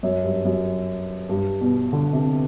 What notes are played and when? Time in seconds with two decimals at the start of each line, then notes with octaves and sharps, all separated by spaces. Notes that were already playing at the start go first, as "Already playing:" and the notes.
0.03 F#2
0.24 G2
0.45 F#2
1.29 G2
1.61 B2
1.93 D3
2.13 C3